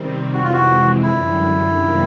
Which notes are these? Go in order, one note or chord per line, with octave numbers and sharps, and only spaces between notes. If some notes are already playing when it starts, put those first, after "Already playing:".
Already playing: C3 D#3 G3 C4
F2 C3 E3 G#3 C4 F#4
F4
F#4
F#2 D3 G3 E4
F2 C3 D#3 G3 A#3